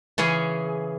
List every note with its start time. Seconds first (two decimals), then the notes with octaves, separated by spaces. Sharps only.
0.18 C#3 E3 C#4 G#4